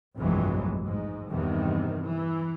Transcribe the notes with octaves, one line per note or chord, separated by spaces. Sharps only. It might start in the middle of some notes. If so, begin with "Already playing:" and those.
F1 A#1 G2 E3 F#3 G#3
G#2
E2 G2 C3 D#3
E3